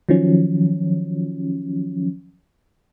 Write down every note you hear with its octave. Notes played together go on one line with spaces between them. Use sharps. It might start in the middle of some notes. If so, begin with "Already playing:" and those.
D#3 F3 F#3 C#4